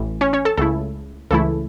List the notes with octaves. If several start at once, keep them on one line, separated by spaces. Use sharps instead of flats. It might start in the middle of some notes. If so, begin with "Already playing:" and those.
Already playing: A1 A2 E3
C#4 C#5
C#4 C#5
A4 A5
C#2 C#3 A3 E4 A4
C#2 C#3 E3 A3 E4 A4